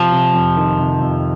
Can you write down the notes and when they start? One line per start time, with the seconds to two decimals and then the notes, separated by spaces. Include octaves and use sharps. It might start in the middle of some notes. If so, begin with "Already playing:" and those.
Already playing: C3 F3
0.12 C3
0.34 F2
0.56 D#3
0.79 C3
1.01 F2